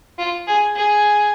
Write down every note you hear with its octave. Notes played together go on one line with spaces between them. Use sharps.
F4
G#4
G#4